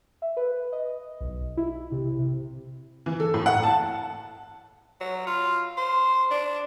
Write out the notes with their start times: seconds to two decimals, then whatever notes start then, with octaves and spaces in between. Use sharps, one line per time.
0.22 E5
0.37 B4
0.72 D#5
1.21 B1
1.57 E4
1.92 C3
2.19 C3
3.06 E3
3.20 A4
3.34 A2
3.46 F#5
3.63 A5
5.00 F#3
5.27 F4
5.77 C5
6.31 D4